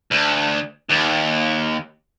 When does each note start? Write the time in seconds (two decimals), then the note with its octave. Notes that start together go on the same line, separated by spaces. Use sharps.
0.11 D2
0.89 D#2